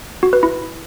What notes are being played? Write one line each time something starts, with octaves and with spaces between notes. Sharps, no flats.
F#4
B4
E4